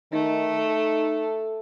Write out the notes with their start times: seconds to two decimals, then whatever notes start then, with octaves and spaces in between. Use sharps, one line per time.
0.12 D#3 A3 D#4
0.58 A4